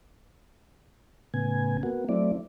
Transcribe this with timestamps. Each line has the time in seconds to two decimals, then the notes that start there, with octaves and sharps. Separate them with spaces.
1.34 A2 C#3 B3 G#5
1.83 A#3 B3 F#4
2.09 F#3 A3 C4 E4 D5